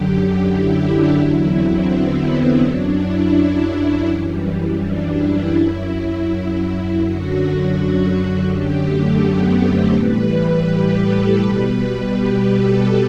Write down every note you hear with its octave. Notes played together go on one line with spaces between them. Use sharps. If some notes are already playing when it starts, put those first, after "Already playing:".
Already playing: F#2 D3 F#3 G4
E4
D4
E2 D3 F#3 E4
C4
B3
B3
F#2 F#3 D4
E4
F#2 E3 G3
D4
E4
F#2 F#3 E4
F#2 D3 F#3 F#4
F#4
F#2 D3 F#3 G4
A3
B3
C4
A2 E3 G3 B4
G4
A4
B2 G3 B4
G4
A4